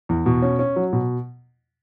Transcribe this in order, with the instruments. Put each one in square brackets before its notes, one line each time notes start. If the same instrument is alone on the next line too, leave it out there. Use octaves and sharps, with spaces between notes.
[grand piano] E2
B2
C#4
C#4
F#3
B2